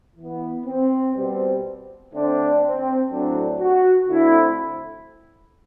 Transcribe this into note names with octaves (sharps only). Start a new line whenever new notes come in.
E3
B3
C4
B2 G3 C4
D3 A3 C4 D4
C4
A2 F#3 A3 C4 D4
F#4
D3 A3 C4 E4